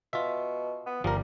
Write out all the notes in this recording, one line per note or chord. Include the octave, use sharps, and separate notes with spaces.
B2 F4 E5
B3
G1 F3 G3 A#4